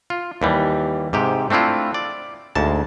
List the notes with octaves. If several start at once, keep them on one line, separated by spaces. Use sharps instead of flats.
F4
D#2 E3 G3
G#2 C3 G4
A3 C4 D4 E4 F4
D5
D2 G#2 A5